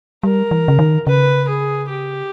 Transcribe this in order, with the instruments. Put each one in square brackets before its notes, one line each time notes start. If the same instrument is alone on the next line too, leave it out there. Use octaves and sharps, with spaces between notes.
[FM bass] G3 [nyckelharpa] A#4
[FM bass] E3
C#3
D#3
[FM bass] C#3 [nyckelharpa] B4
[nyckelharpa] G#4
G4